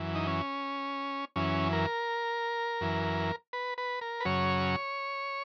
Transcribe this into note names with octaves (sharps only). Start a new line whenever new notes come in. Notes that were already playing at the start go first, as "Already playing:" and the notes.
Already playing: F#2 E3
D#4
C#4
F#2 E3 C#4
A#4
F#2 E3
B4
B4
A#4
B4
F#2 C#3 F#3 C#5